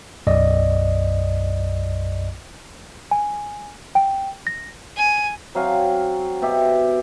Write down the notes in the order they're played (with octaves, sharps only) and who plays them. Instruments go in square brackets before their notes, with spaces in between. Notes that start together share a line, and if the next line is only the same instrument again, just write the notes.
[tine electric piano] B1 F#2 D5 D#5
[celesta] G#5
G5
A#6
[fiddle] G#5
[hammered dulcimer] F#3 C4 F5 G#5
B2 G4 E5